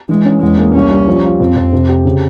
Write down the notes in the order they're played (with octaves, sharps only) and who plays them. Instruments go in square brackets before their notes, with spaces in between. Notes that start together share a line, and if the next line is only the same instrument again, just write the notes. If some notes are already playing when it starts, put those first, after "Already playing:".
[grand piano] E3 [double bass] G#3
[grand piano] C#4
[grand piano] E2 [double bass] G#3
[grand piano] A#3
[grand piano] C2 [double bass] C#4
[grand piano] G3
F3
F4
[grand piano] F2 [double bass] C4
[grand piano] F2
C3
G4
C#3